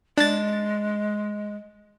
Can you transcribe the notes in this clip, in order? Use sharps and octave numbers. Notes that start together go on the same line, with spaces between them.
G#3 D4 A6